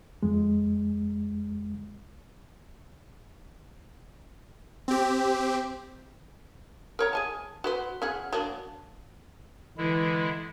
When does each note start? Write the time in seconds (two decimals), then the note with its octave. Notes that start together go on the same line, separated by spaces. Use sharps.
0.23 F2 G#3
4.88 C4 G4
6.99 A#4 C#5 A#5
7.13 G#4 G#5 A5
7.64 F#4 B4 C5
8.02 C#4 G#4 F#5
8.33 F#3 A#3 D4
9.78 D3 E3 G#3 E4